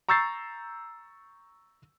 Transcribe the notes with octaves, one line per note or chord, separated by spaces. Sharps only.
A#5 C#6 E6 G6 A6 C7